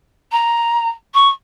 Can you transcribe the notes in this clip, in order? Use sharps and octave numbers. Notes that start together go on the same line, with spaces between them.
A#5
C#6